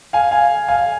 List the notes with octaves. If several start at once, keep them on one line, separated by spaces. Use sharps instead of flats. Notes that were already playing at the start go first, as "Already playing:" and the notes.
F5 G#5
F5 G#5
F5 G#5